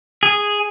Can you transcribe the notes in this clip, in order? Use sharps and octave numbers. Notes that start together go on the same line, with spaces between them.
G#4